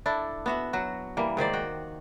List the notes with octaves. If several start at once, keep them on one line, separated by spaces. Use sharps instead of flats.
D4 E4 A4
B3 F#4 E5
F#3 F#4
E3 G3 A#3
G#2 D#3 C5 D5
F#4 G5